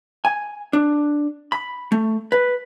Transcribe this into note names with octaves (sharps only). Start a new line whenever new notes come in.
G#5
D4
B5
A3
B4